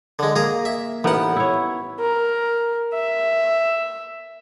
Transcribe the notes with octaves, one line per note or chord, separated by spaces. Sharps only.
D3 G#3
A#3 G#4 A#5
E5
A1 B3 D#4 A#4 F#5
E4 C#5
A#4
E5